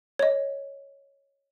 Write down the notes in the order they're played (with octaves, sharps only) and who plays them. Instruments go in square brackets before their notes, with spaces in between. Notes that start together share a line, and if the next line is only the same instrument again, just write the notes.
[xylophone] C#5 D#5